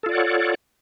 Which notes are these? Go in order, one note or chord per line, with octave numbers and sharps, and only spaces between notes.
F4 A4 C#5 D5 F#5